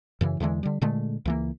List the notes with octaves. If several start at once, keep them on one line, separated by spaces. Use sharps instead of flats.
F#2 C#3 E3
E2 D3 E3 G#3
D3 G3
A#2 D3 G#3 A3
C#2 E3 A#3